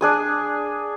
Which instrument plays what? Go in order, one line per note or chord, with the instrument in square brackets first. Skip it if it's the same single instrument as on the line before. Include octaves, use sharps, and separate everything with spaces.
[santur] D4 G#4 D#6